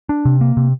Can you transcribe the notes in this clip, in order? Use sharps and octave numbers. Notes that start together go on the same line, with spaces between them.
D4
C3
A#3
C3